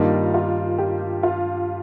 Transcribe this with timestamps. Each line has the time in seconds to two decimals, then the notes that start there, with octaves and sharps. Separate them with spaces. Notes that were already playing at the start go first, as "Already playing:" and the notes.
Already playing: G2 D#3 G3 A#3 D#4 F4
0.34 F4
0.78 G4
1.23 F4